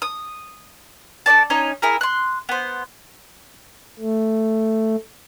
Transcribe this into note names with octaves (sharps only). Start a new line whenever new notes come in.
D#6
D4 A4 D5 A5
C#4 D#4 C#5
E4 G#4 A#4
C6 F#6
B3 C5
A3